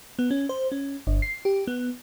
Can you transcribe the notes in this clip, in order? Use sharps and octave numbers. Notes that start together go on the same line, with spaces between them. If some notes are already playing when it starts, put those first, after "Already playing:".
B3
C#4
C5
C#4
G1
C7
G4
B3